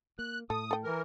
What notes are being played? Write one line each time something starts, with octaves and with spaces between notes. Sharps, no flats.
A#3 F#6
A2 A4 D#6
A4 G5
E3 A#4